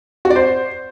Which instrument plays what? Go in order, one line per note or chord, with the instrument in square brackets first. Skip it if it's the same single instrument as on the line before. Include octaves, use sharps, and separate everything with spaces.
[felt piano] F#4
D5
C5